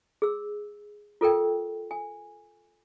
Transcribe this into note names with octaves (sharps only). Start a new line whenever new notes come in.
G#4 E6
F4 A4 A#4 G5
G#5